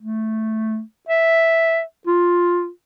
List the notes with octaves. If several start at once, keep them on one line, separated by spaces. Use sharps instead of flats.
A3
E5
F4